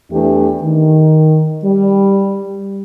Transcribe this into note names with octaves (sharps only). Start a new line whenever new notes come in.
E2 E3 A3 D4 G4
D#3
G3